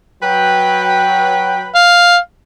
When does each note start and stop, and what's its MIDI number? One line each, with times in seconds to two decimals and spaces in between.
0.22 1.71 54
0.22 1.71 71
0.22 1.71 79
1.75 2.18 77